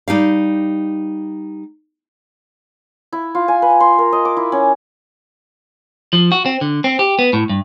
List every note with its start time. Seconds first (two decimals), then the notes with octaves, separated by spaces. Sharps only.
0.08 G3 D#4 G4 F5
3.13 E4
3.35 F4
3.48 G#5
3.62 B4
3.80 C6
3.99 A#4
4.12 D#5
4.25 D6
4.37 E4
4.52 C#4
6.13 F3
6.32 F#4
6.46 C4
6.61 D3
6.84 C4
6.99 G4
7.19 B3
7.33 A2
7.50 G2